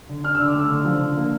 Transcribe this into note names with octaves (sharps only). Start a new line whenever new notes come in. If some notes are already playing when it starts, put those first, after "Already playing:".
D3
D4 F6
D3 E6
D6
A3 E6
D3
F3
D3
A#3